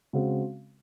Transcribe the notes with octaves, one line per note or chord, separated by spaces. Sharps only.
C#3 G#3 C4 F#4